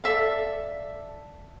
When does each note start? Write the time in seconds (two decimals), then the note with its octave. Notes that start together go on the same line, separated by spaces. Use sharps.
0.04 A4 D5 E5 F5